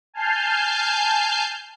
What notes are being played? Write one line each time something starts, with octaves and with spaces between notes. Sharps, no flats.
G#5 A5 F6 G6 C7